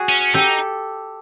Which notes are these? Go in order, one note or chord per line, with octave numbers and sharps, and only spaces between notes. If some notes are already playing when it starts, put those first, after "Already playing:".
Already playing: F#4 G#4
C#4
D#4 G4 A4